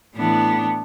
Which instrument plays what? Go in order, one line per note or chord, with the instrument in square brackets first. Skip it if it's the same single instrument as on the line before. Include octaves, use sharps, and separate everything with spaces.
[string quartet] A2 E3 B3 D4